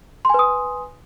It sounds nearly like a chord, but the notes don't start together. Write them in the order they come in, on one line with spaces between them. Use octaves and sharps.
C6 G#5 B4 D#6